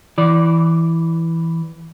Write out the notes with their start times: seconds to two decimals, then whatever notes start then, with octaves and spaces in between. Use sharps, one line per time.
0.18 E3 D5